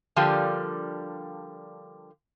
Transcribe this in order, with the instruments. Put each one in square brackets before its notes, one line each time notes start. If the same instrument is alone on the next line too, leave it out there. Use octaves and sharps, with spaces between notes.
[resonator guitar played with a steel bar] D3 F3 G3 A#3 D4 G4